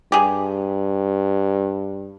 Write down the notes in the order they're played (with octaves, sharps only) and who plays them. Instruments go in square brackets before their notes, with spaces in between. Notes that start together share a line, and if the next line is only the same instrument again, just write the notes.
[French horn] G2 [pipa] G4 G#4